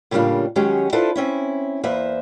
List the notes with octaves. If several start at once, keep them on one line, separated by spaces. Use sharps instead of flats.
A2 C#3 G3 A#3 D4 F4
D#3 F#3 G#3 C#4 G4 G#4
D4 E4 F4 A4 B4 C5
C4 C#4 E4
E2 A#3 B4 C5 E5